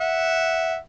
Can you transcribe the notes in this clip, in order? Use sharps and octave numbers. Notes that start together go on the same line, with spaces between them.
E5 F#5